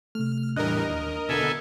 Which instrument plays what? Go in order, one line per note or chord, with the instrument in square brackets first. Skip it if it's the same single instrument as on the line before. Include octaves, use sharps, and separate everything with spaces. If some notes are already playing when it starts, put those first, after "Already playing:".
[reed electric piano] C3 A3 [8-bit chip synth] F6
[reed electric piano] E2 D4 F#6 [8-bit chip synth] A2 E3 G3 [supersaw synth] A#4 D#5
[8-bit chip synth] D#2
[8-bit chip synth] B2 D3 B3 [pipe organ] A4 E5 G#5